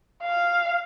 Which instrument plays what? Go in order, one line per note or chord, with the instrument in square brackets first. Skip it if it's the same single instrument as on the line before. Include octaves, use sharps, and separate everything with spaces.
[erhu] F5